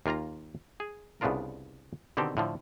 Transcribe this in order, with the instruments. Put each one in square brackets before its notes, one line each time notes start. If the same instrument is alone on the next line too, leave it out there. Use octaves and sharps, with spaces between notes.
[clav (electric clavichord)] D#2 A#3 F4 F5 A#5
G#4
C2 C#3 B3 D4 F4 A#4
B2 D3 D#3 C4 G4 A4
A2 D3 F3